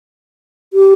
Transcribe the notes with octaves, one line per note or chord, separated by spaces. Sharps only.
G4